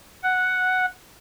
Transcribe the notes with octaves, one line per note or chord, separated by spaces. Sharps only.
F#5